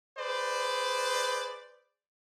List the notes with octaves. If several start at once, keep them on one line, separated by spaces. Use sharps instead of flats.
G#4 B4 C5 D5